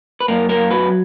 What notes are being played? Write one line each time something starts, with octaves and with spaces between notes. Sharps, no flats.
B4
F#2 A#3 A#4
A#3 A#4
F#3 B3 B4